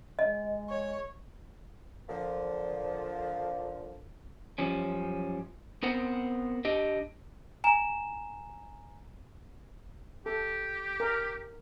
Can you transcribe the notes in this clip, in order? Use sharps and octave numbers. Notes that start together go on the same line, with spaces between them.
G#3 D#5
C#5
A#2 D3 F3
F#2 F3 G3 C#4
B3 C4 A#4 C5 F#5
D4 G4 D#5
G#5 A#5 E7
G4 A4
A#4